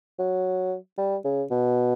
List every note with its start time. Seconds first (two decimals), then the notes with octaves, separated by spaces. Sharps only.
0.19 F#3
0.98 G3
1.25 C#3
1.51 B2